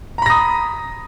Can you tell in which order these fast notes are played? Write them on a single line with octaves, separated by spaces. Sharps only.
A#5 B5 A#6 D#6